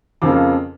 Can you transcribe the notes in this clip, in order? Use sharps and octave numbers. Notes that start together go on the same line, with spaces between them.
F2 C#3 F3 A#3 D6